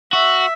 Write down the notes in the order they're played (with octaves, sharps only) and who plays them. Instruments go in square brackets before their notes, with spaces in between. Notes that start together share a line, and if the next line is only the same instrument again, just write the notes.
[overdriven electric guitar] F#4 [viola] E5